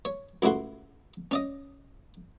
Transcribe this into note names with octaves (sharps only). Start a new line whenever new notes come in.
C#5
C#2 A2 E4 F#4 C6
C#4 D5 D#5